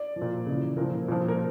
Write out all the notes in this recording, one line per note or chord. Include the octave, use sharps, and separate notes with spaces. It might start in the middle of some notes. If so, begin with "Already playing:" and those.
Already playing: D5
F3
A#2
C#3 E3
A#2 F3 A#4
A#2 F3
A#4